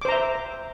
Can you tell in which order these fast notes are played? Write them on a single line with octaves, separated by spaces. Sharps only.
D6 C5 A#5 E5